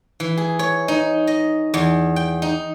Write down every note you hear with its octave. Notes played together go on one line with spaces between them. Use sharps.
E3
G#4
C#5
D#4
D#5
E2
G5
D#4